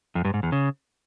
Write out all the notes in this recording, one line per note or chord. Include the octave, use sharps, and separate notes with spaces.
F2
G2
G#2
E2
C#3